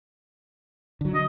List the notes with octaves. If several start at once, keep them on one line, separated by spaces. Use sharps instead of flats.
D3 F#3
D#5